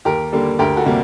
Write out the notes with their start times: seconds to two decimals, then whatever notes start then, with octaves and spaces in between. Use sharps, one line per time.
0.05 D#2 G4 A#4
0.32 D3 G3 A#3
0.59 D2 G4 A#4
0.76 F#4 A4
0.86 C3 G3 A#3